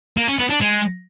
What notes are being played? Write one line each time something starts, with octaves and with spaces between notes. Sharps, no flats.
A#3
C#4
B3
D4
G#3